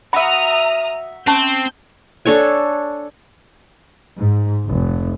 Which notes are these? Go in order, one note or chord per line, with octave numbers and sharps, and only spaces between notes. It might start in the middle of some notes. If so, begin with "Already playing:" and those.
F#4 E5 A#5 B5 D#6 F6
C4 C#4 A5 C#6 G6
D4 A4 C#5 G#5
G#2
F1